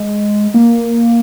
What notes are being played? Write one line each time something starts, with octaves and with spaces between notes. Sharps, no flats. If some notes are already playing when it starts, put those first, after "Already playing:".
Already playing: G#3
A#3